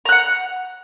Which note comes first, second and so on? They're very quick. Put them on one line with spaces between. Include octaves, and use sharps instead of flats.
A#5 F#6 F#5